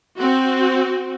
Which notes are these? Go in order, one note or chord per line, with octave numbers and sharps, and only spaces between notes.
C4 F#4